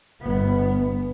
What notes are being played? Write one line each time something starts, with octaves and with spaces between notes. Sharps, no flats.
G1 B3